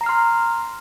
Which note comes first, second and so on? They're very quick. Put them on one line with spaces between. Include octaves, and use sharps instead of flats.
A#5 C7 F6 C6